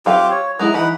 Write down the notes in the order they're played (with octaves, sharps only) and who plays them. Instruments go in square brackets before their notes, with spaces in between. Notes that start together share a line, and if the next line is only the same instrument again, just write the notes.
[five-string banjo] F#3 F5 [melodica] C4 F4 G4
[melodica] C#5
[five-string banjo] F#3 G#3 E4 [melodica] A#5
[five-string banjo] E3 [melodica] D#4 F#5 B5